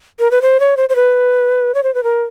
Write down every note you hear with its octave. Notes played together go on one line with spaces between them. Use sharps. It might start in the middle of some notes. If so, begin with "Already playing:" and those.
A#4
B4
C5
C#5
C5
C5
B4
C#5
C5
B4
A#4